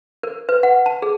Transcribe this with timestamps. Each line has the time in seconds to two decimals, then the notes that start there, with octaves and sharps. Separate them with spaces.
0.23 A#4
0.49 B4
0.63 F#5
0.86 A5
1.02 G#4